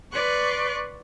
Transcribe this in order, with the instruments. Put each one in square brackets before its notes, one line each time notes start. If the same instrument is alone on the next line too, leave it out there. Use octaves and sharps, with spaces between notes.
[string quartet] B4 D5 C6 C#6 F#6